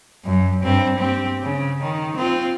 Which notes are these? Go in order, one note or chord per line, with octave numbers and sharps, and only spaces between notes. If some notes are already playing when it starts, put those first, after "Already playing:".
F#2
G2 C4
C4 G4
C#3
D#3
C4 F4